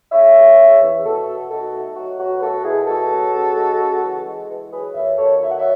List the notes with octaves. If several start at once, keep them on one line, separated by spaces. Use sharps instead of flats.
C#3 C#5 E5
E2
C#3
E2
B2 F#4 A4
B2
D#4 F#4 A4
A3
F#3 F#4
B2 F#4
B4
A3 F#4 A4
B2 E4 G#4
G#3 F#4 A4
C#3
C#3
G#3
C#3
E3
G#3
E3
F#3 G#4 B4
D#2 C#5 E5
D#2 A4 C#5
F#3 E5
F#5
C#5 E5